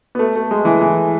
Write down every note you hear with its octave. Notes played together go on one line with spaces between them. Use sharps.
B3
A3
A3
G#3
E3
E3